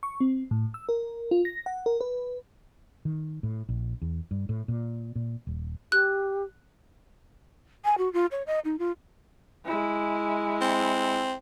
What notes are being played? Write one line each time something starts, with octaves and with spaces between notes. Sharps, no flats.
C#6
C4
A2
E6
A#4
F4
A#6
F#5
A#4
B4
D#3
A2
A#1
E2
G2
A2
A#2
A#2
D#1
G4 F#6
G#5
F#4
F4
C#5
D#5
D#4
F4
G#3 E4
C4